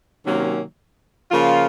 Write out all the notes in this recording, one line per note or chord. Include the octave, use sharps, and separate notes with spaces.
C3 D#3 F#3 A#3 C#4
C#3 F3 A#3 F4